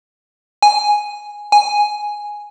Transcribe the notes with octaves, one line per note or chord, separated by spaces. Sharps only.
G#5
G#5